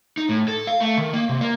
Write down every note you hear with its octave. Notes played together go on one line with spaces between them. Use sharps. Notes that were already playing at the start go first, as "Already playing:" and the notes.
D#4
A2
A4
F5
A3
D#3
A#3
C3
A#3